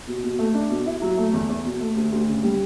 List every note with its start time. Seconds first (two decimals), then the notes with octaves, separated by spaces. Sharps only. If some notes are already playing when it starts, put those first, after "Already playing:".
0.07 B2
0.24 B2
0.39 A3
0.55 D4
0.70 B2
0.86 E4
1.01 F#3
1.17 A3
1.33 E2
1.49 E2
1.65 B2
1.80 A3
1.96 D2
2.12 D2
2.28 C#3
2.43 G3